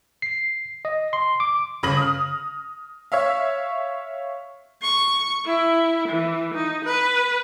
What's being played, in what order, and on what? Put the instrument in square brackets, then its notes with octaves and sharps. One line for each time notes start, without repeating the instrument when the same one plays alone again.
[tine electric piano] C7
D#5
C6
D6
[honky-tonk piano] G1 C#3 B5 A#6 F#7
D#6 F6
C#5 E5 F5
[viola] C#6
E4
E3
D#4
B4